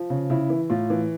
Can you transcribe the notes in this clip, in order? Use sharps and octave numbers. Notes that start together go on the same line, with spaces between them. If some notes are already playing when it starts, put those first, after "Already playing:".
Already playing: F3
C#3
C#3 E4
E3
A2 F4
E3